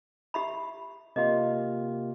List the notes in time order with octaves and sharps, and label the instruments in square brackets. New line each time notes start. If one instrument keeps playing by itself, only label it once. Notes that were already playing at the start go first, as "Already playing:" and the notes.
[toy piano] G4 E5 B5
[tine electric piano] C3 A#3 F4 [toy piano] D#5